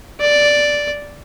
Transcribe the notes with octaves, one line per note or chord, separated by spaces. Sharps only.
D5